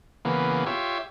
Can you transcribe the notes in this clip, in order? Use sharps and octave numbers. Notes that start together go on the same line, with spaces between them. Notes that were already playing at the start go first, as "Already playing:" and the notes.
C#3 E3 A#3 B3
F4 G4 C#5 E5